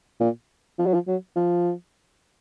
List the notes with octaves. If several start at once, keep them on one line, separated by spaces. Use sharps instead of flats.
A#2
F3
F#3
F3
F#3
F3